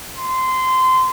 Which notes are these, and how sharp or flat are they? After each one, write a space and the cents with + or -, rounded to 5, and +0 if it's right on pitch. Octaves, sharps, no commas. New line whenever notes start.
C6 -20